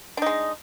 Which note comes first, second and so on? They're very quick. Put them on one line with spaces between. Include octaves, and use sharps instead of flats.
D4 D#4 G#3